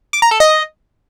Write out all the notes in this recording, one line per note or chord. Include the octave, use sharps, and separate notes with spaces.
D6
A#5
A4
D#5